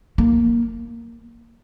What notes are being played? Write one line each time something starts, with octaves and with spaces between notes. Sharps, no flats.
A#3